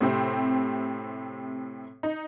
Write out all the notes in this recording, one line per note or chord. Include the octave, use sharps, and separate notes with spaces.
A2 C3 C4
D#4